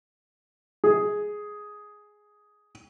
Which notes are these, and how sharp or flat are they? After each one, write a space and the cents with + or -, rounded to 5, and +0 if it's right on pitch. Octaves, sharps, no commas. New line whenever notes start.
G#4 +5